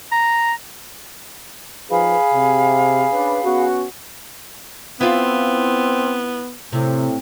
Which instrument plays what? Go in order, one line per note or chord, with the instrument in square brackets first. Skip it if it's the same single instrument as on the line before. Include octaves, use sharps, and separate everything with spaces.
[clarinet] A#5
[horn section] F3 D#4 B4 [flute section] G#4 F5 B5
[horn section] C3
C#4 D4 B4
B3 C#4 F#4
[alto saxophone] B3 [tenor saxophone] C4 [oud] E4 F4
[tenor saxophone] A2 [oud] C3